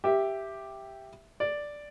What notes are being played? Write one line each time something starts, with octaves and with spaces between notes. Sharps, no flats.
G4 E5
D5